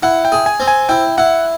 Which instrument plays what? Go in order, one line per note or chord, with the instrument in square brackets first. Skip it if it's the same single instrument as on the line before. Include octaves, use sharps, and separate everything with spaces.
[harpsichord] E4 [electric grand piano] F#5
[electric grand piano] G5
[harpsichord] G#4
[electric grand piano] G#5
[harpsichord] C4
[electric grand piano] G#5
[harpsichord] E4 [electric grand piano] G5
[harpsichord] E4 [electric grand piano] F#5